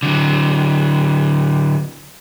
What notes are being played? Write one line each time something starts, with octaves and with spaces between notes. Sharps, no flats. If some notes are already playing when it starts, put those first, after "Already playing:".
D3 F#3